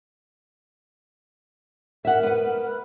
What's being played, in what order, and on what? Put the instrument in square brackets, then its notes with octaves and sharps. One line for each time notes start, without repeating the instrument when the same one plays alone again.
[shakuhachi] A#4 [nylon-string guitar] E5 F#5
[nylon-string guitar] B3 B4
[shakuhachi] B4